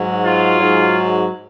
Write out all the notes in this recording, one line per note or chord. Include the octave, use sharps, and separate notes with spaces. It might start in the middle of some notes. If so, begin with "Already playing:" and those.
Already playing: G#2 F#3
F4
G#2 F#3